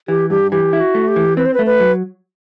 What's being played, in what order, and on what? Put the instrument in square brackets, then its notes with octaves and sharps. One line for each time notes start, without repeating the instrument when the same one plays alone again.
[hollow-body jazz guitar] E3 [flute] G4
[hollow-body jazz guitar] G2 [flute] G4
[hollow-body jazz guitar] E3 [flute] G4
[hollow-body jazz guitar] E4
[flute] F#4
[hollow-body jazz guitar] A3
[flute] G4
[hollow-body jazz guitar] E3
[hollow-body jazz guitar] C4 [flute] B4
[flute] C5
B4
[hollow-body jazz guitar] A3
[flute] B4
[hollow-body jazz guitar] F#3